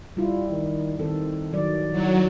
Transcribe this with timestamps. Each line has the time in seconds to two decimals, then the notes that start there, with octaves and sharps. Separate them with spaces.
0.17 G3 E4 F4
0.50 D#3
0.99 D#3 C4 A4
1.53 D#3 F#3 D5
1.92 D#3 F#3 E4